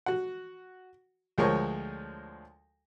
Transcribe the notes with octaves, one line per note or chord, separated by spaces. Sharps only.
F#4 F#5
D2 F3 G#3 A#4 C#5 C#6